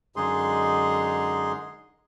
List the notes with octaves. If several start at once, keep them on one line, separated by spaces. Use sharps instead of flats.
F#2 D3 G#3 D#4 G#4 C6